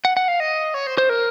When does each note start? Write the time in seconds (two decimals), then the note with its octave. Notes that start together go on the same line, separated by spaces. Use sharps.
0.05 F#5
0.17 F#5
0.28 F5
0.40 D#5
0.74 C#5
0.87 C5
0.98 C5
1.09 A#4